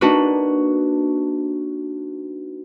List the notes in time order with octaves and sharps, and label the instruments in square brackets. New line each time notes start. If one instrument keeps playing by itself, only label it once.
[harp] A#3 D4 D#4 F#4 B4